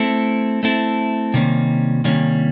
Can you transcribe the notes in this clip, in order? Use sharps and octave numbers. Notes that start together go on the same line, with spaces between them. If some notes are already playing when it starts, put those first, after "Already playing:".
Already playing: A3 C4 E4 A4
A3 C4 E4 A4
C3 D#3 G3 A#3 C#4
C3 D#3 G3 A#3 C#4